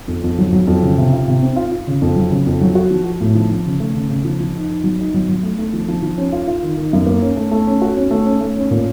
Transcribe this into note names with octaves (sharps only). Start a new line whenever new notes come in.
F2
F2
F#3
F#3
F2
C#3
C3
F4
C3
C4
F4
F4
C#3
F2
F#3
C#3
F2
F#3
F#4
F3
F#4
A2
F3
F3
C#3
A3
C#3
C#3
F3
F3
D#4
D#4
F#3
D#4
F#3
F#3
A3
A3
F3
F3
F3
C#4
F4
F4
D#3
D#3
F#2
A#3
C#4
A3
A3
C#4
F#4
C#4
A3
C#4
A3
C#4
A#2